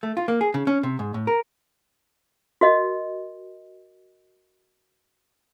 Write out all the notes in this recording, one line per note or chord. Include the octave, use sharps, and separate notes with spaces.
A3
F4
A#3
G#4
C#3
C#4
C3
G#2
A2
A#4
F#4 A#4 D#5